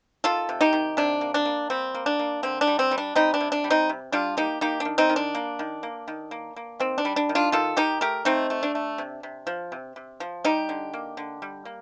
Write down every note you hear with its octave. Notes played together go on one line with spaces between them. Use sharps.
D#3 F4 A4
C3
D#4 G4
D#3
C3 D4
A#3
D4
A#3
G3 C4
A#3
D4
A#3
D3 C4
D4
G3
C4
G3
D4
G3 C4 D#4
D4
C3
D4
G3
C4 D#4
C3
G3 D4 F4
A#3 D#4 G4
A#3 D#4 G4
D4
D#3
C4 D#4
D#3
D4
A#3
D#3
A#3
D#3
A#3
A#3
D#3 C4
D4
G3
D4
D#3
D4 F4
D#3 F4 A4
D#3 D#4 G4
A3 G4 A#4
A3 C4 D#4
A3
D4
A3
C3
C3
F3
C3
C3
F3
G3 D#4 G4
D3
A#3
D3
G3
A#3